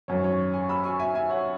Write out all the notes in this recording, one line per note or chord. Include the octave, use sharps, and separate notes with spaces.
G#1 F#2 F#3 C#5
C#5
G#5 C#6
B5 E6
G#5 C#6
E5 G#5
E5 G#5
C#5 F#5